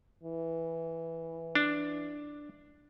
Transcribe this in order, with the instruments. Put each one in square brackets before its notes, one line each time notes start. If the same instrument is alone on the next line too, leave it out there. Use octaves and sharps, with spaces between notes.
[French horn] E3
[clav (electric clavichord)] D4